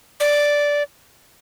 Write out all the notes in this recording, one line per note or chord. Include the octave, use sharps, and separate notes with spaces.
D5